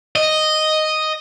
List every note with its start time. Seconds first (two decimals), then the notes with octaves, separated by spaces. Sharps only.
0.16 D#5